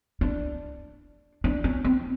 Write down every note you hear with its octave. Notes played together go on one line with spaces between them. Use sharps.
D4
D4
C#4
C4